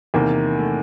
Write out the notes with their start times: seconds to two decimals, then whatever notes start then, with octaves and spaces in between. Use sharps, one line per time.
0.14 E2 C3 D#3 A#3
0.59 A3